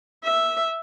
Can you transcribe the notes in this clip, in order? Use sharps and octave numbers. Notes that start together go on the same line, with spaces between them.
E5